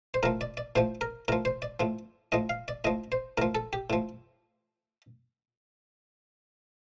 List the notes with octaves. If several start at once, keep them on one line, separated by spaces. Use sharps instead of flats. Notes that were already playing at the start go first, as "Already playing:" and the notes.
C5
A2 F3 A#4
D5
D5
A2 F3 C5
A#4
A2 F3 A#4
C5
D5
A2 F3
A2 F3 D#5
F5
D5
A2 F3 D#5
C5
A2 F3 A#4
A4
G4
A2 F3